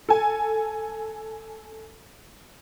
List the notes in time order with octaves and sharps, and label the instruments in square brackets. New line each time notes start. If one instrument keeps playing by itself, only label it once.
[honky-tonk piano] A4 G#5